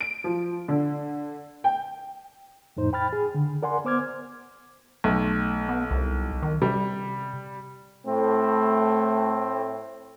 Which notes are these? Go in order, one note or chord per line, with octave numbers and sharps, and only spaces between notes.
D7
F3
D3
G5
F2 A2 D#4 C5
G5 B5 F6 A6
G#4
D3
A#4 D5 F#5 G#5 C6
B3 C5 D6 F6 G#6
B1 A3
B3
C2
D#3
C3 G3
A2 A3 C4